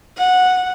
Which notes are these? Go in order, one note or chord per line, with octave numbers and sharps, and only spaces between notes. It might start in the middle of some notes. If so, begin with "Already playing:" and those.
F#5